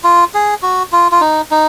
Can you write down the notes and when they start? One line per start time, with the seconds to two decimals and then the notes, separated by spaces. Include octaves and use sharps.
0.04 F4
0.34 G#4
0.62 F#4
0.92 F4
1.12 F4
1.21 D#4
1.51 D#4